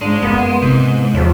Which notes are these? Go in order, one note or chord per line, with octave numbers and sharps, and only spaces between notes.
G#2 C#3 G#3 D4
F#2 A#3 B3 F4
G#2 C3 E4
E2 F3 A4 C#5